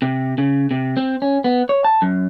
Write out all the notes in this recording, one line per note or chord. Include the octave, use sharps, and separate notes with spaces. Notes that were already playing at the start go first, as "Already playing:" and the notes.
C3
C#3
C3
C4
C#4
B3
C#5
A5
F#2